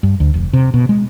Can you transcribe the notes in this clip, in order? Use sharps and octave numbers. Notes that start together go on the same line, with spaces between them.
G2
D2
F1
C3
B2
G#3